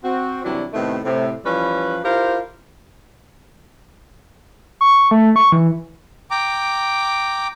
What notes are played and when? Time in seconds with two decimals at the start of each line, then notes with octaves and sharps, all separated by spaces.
0.03 C4 F#4
0.44 C3 E3 F#3 G3 D4 E4
0.73 A2 C3 D#3 A3 B3 C4
1.03 A2 C3
1.45 E3 F3 G3 C#4 B4
2.04 E4 F4 G4 A#4 C5 F5
4.81 C#6
5.11 A3
5.36 C#6
5.52 E3
6.31 G5 A#5 D6